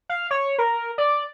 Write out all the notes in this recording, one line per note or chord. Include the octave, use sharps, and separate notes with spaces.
F5
C#5
A#4
D5